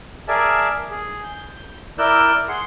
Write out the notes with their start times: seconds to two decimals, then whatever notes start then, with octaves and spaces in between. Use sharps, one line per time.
0.28 G#4 A#4 D5 E5 G#5 A5
0.91 G#4
1.24 G6
1.98 E4 A#4 D5 E6 F#6 G6
2.48 G#4 F#5 C6